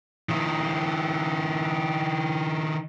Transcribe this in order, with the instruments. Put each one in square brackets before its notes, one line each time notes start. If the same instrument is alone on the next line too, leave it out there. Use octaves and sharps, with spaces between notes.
[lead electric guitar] D#3 E4